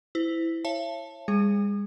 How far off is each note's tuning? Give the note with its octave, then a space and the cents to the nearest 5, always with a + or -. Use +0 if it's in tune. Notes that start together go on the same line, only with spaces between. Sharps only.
E4 +0 C5 -35
C#5 -25 E5 +45 A5 +0
G#3 -45 G#4 +0